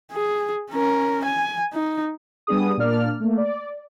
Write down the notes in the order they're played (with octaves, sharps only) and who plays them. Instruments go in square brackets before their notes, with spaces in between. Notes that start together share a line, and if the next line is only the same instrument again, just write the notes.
[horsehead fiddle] G#4
C#4 A#4
G#5
D#4
[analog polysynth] G3 B3 D4 G#4 D#6
A#2 A#3 D4 D5 F6
A3 A#3
D5